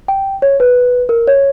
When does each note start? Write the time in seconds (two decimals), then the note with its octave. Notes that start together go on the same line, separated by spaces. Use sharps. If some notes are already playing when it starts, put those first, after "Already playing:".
0.08 G5
0.42 C#5
0.60 B4
1.09 A#4
1.27 C#5